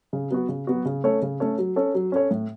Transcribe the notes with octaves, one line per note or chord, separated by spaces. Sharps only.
C#3
F#3 B3 F#4
C#3
F#3 B3 F#4
C#3
A3 C#4 A4 C#5
C#3
A3 C#4 A4 C#5
F#3
C#4 A4 C#5
F#3
C#4 A4 C#5
A2